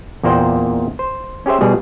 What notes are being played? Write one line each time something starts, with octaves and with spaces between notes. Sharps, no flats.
E2 A#2 A#3 C5 D5 G5
C5
C#4 G4 G#4 C5 E5
B2 G3 G#4